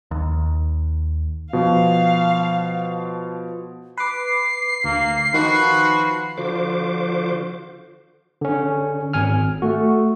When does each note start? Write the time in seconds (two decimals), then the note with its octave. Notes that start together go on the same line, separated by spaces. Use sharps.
0.11 D#2
1.53 B2 F3 F5
3.98 B4 D6 C7
4.84 D2 A#3
5.34 D#3 F3 F#4 B4
6.38 D3 F3 F4 F#4 C5 D6
8.41 D3 C#4
9.14 G#1 G#5 F6
9.62 A3 F#4